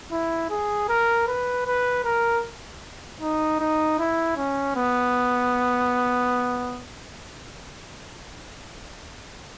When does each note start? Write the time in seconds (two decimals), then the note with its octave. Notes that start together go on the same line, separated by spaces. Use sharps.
0.11 E4
0.50 G#4
0.89 A#4
1.28 B4
1.66 B4
2.05 A#4
3.21 D#4
3.60 D#4
3.99 E4
4.37 C#4
4.76 B3